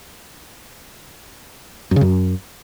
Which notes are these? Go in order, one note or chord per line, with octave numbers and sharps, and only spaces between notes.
F#2
C#3
F#2